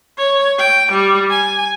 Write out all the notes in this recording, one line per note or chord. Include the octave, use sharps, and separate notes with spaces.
C#5
G5
G3
G#5